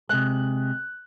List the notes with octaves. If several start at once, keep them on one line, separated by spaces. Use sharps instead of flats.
C3 G#3 F#6